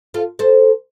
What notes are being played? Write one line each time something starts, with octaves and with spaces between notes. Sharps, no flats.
F4 A4
A4 C5